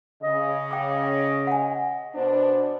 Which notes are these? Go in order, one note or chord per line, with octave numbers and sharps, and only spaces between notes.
C#3 D#5
G5 D6
F#5 G#5
B2 B3 D4 C5